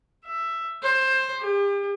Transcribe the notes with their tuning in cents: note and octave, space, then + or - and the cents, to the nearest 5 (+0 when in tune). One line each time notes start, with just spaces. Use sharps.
E5 +10
C5 +15
G4 +40